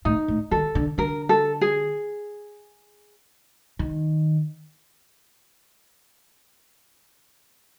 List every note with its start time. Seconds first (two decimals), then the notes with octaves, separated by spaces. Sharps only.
0.05 A2 D#4
0.28 A2
0.51 D#3 A4
0.75 D3
0.98 D3 A#4
1.29 A4
1.61 G#4
3.79 D#3